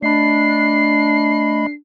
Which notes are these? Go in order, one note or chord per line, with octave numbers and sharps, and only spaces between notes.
A3 D4 D#5 B5 C7